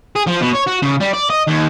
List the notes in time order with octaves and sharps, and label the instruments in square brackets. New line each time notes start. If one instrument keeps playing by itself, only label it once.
[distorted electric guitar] G#4
F3
B2
C#5
F#4
C#3
G3
D5
D#5
D#2